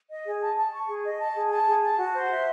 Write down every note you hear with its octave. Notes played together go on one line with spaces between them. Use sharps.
D#5
G#4
A5
A5
C#6
G#4
D#5
A5
G#4
A5
G#4
A5
F#4
C5
E5